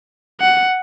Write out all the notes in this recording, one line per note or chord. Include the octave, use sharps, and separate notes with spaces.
F#5